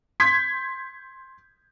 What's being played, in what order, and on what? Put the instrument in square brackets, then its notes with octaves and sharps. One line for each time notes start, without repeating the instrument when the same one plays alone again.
[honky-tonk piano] C6 G6 G#6 B6